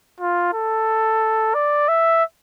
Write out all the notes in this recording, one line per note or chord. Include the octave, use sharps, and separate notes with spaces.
F4
A4
D5
E5